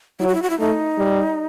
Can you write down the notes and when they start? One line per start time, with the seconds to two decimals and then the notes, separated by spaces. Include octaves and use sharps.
0.20 F#3 E4
0.27 F#4
0.35 E4
0.42 F#4
0.50 E4
0.59 A3 D#4
0.98 G3